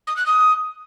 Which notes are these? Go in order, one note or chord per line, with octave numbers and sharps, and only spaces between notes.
D#6
F#6
D#6